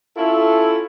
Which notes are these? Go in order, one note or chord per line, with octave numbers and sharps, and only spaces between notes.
C#4 E4 F4 A4